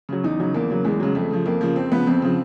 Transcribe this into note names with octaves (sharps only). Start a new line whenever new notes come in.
C#3 F#3
E2 D#4
C#3 F#3
E2 A#3
C#3 F#3
E2 G#3
C#3 F#3
F2 A3
C#3 F3
F2 A#3
C#3 F3
F2 C4
C#3 F3 B3
F2 C4
C#3 F3